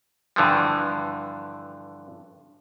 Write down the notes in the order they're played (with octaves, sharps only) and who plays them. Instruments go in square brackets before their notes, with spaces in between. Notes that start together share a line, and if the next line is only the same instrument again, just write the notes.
[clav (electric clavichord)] G2 D3 E3 F3